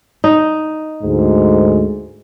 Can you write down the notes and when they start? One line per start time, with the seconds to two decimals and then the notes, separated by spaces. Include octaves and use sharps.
0.24 D#4
1.04 D2 G#2